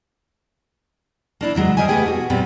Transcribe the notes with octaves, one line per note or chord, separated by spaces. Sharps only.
A#3 D4 E4
C#3 E3 F#3 G#3
A#4 C5 D#5 E5 G#5
A3 B3 G4 G#4 G5
B2 F#4
A#2 F#3 B3 C4 G4